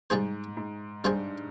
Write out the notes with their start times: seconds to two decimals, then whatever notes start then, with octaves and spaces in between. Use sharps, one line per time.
0.10 G#2 G3 C4 F4 G#4 C5
0.57 G#2
1.04 G2 G3 C4 F4 G#4 C5